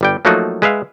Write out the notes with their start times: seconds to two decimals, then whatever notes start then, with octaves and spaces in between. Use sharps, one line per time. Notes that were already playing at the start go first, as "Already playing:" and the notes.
0.01 G1 G3 G5
0.25 F3 F#3 A3 A#3 D#4 F#4
0.62 G#3 B4 E5 F5